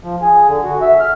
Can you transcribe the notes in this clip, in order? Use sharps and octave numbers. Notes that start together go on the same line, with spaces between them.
F3
G#4
D3
F#4
E5
F6